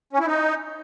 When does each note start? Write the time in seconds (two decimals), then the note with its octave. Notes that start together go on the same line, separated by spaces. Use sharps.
0.13 C#4
0.20 E4
0.27 D#4